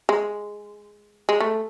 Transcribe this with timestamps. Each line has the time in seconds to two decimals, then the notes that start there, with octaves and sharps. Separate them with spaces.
0.09 G#3
1.29 G#3
1.40 A3